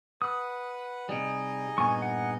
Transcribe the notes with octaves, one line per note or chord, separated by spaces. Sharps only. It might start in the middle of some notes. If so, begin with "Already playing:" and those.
B4 F#5 D#6
C3 G3 D#4 G#4 D#5
G2 A#2 B3 G#5 C#6
F#5